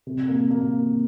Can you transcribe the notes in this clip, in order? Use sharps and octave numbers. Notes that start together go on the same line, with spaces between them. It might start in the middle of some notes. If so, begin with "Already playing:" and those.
C3
A#3
A#3